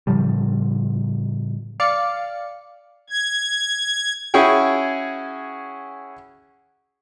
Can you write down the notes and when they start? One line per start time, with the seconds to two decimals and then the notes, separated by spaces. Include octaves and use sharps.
0.07 A2 C#3 F3 G3
1.80 D5 F5 C#7
3.10 G#6
4.34 C#4 E4 F#4 G#4 G5